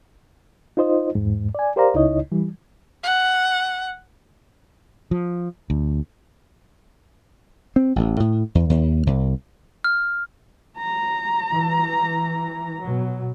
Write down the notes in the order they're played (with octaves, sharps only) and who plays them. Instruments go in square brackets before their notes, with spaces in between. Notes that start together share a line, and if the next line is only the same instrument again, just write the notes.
[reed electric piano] D#4 F4 C5 D#5
E2 G#2
D5 G#5
G4 A#4 C5 D5 F5 A#5
C#2 C#3 D#4 E4 C#5 D#5
E3 G3
[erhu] F#5
[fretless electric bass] F3
D2
[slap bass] C4
A1
A2
E2
D#2
C2
[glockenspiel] F6
[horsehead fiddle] A#5
[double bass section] E3
B2 F#3